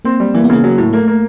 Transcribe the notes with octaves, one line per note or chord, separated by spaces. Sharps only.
A#3 C4
G3
E3 A#3
B3
C#3 A#3
F#3
A2
A3 A#3
A#3